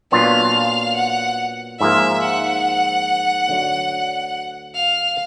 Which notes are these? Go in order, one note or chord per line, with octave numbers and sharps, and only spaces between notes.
A#2 F#3 B3 D4 F4 F5
F#5
G#2 F3 A#3 E5
F#5
D2 D3 F#3
F5